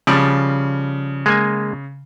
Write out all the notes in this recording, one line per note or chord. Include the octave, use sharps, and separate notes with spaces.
C#3 F3 G3 D5
G#3 A#3 G#5